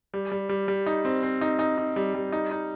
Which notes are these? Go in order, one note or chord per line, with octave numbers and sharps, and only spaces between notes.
G3
G3
G3
G3
D#4
C4
C4
D#4
D#4
D#4
G3
G3
D#4
D#4